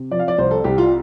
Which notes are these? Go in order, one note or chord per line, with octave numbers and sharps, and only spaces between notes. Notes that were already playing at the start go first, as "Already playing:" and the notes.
Already playing: C3
F3 D5
F5
D5
C2 C5
A4
C2 G4
F4